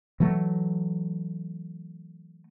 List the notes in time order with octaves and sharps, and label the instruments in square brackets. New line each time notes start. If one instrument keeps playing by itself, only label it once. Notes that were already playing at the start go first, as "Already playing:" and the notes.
[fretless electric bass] E3 F#3 A3